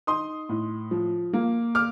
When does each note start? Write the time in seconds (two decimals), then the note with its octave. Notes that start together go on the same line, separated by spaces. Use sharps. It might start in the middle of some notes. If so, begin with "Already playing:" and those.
0.07 D#4 C6 D#6
0.49 A2
0.91 F3
1.33 A#3
1.75 D6 F6